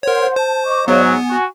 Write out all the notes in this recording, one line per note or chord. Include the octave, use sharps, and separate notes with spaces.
A#4 C5 C#5 F#5
C5 A5
D#5 C#6 D6
G#2 F#3 B3 C#5 D5 F5
G#5
F#4